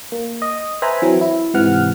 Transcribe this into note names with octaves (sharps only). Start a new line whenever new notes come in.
A#3
D#5
B4 C5 E5 G#5 A#5 B5
E3 F#3 C4
E4
G#2 C3 E3 F#5 F6